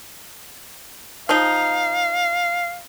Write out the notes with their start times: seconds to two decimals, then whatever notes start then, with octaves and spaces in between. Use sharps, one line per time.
1.29 F3 D#4 F5